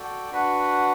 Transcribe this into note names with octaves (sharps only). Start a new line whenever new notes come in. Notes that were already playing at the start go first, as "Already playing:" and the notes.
Already playing: F#4 A4 D5 G5
D4 F#4 B4 F#5